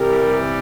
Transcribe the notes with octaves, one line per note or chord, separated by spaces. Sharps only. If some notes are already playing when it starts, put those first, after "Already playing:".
Already playing: C3 E3 G3 G4 A#4